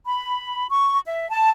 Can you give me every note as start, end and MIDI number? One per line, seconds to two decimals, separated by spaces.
0.06 0.65 83
0.69 0.98 85
1.05 1.28 76
1.29 1.48 81